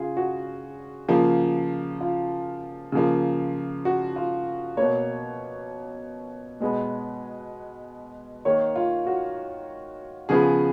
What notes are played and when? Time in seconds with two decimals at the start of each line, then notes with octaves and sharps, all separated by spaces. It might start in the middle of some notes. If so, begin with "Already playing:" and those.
Already playing: C#3 F4 G#4
0.17 F#4
1.09 C#3 F3 A#3
2.01 F4
2.92 C#3 F3 A#3
3.85 F#4
4.16 F4
4.77 B2 A#3 C#5
6.60 B2 G#3 B3
8.45 D#3 A#3 C#5
8.76 F4
9.06 F#4
10.29 C#3 F3 B3 G#4